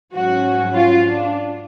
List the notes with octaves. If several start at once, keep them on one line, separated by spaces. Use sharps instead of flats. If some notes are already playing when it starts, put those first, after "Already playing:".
G#2 F#3 C#4 F#4
F4
D4